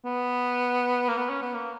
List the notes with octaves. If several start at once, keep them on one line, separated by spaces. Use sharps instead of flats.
B3
A#3
B3
C#4
B3
A#3